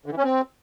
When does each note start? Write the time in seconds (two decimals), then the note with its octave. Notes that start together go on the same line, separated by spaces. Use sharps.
0.06 D3
0.12 E3
0.17 C#4
0.23 C4